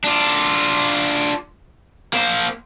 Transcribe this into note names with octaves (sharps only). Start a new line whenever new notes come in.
D4 F4
A#3 C5